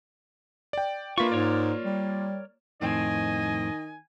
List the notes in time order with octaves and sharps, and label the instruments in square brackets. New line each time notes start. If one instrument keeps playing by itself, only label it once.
[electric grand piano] D5 G5
[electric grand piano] A#3 F4 [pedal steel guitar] D4 E5 C#6 [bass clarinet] B4
[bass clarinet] G#2 [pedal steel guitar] A#4 C#5 D5
[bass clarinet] G3
[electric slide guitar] F2 A2 C4 [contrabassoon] D#3 [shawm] D#5 [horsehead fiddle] G#5